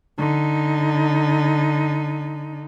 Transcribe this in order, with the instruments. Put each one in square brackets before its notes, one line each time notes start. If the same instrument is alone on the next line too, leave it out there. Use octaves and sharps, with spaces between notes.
[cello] D3 D#4